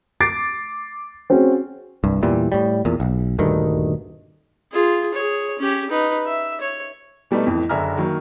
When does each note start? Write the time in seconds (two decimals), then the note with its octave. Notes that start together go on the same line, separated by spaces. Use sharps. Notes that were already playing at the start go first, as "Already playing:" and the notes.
0.20 D6 A6 C7 D7
1.30 C4 C#4 F#4 G#4
2.04 C2 G2
2.23 E2 A#2 E3 G3
2.52 A2 G3
2.85 E2 A#2
3.00 B1
3.39 D#1 D2 G2 D#3
4.72 F4 G#4
5.14 G#4 C#5
5.59 C#4 G4
5.90 D#4 B4
6.26 E5
6.61 C#5
7.31 B2 G3 A3 B3 D#4
7.46 F2 A2 E3
7.69 F#1 D3 E5 G#5 A#5 F6
7.98 D#3 F#3 A#3